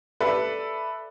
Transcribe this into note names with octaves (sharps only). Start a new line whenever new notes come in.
A4 B4 D5 E5